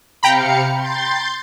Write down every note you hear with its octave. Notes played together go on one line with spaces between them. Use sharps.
C3 F5 G5 A#5 B5 C#7
C6 G6 A6